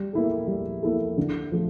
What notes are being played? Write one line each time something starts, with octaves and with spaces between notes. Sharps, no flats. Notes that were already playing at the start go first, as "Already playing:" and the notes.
Already playing: G3
A#3 E4 A4
G3
A#3 E4 A4
D3
F3 A3